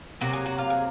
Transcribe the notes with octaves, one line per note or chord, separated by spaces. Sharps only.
C3 F#3 A#3 F#4
G#4
F#4
F4
G#4